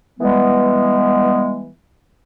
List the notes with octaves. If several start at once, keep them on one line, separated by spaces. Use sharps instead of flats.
E3 G3 G#3 B3